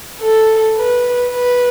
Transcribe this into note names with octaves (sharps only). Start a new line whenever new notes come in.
A4
B4
B4